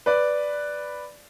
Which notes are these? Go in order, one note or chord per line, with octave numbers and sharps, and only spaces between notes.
B4 D5